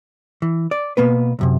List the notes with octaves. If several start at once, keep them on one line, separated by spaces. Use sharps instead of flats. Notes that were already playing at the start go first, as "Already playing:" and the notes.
E3
D5
B2 A#3 B3 B4
C2 F#2 C3